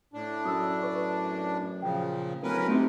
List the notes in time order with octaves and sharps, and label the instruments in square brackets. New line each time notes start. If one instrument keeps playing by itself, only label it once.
[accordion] A2 D4
[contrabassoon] F#2 [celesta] D#6 E6
[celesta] B4 C#6
[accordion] A#2 C#3 F3 [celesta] G5
[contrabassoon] D1 [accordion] C#4 A#4 B4
[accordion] C3 D#3 [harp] A3 C4 D#4